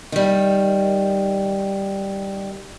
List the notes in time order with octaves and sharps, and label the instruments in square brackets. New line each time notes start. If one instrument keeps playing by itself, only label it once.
[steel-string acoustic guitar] D#3 G3